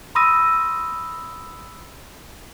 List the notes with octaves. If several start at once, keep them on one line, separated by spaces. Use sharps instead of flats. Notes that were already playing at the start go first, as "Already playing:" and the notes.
B5 C6 D#6 E6 A#6 D#7